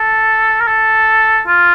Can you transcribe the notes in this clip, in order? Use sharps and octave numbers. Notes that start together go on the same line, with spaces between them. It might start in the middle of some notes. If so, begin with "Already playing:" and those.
Already playing: A4
A#4
A4
F4